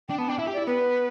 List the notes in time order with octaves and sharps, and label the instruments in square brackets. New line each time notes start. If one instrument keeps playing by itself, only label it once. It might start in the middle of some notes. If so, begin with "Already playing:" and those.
[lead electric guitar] D4 [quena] G5
[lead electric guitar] B3 [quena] A5
[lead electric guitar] D4 [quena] G5
[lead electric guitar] E4 [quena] E5
[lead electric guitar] G4
[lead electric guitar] E4 [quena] D5
[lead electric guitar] B3 [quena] B4